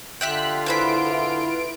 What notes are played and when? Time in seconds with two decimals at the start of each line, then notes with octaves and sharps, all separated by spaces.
0.21 D3 F4 G4 E5 G5 F#6 B6
0.66 E4 G#4 B4 C5 B5 D7